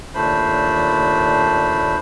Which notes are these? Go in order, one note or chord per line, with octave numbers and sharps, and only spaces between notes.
D#2 A#2 A3 D4 C5 B5